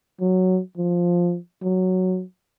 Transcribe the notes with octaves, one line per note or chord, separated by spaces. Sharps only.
F#3
F3
F#3